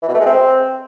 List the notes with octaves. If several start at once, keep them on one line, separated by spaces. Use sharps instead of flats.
E3
B2
A3
G#3
C4